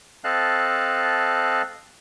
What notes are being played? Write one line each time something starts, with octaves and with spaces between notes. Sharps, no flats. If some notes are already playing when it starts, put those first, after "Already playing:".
C4 A4 D#5 F5 A5 F#6